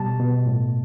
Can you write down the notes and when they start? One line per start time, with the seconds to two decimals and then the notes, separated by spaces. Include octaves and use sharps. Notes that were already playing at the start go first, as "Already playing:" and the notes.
Already playing: B2 G3 A5
0.19 B2
0.46 A2